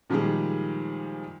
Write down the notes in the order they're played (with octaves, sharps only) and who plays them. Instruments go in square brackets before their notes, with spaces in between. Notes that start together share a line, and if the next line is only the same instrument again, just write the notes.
[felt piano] A#2 D#3 F3 G3 G#3 G#4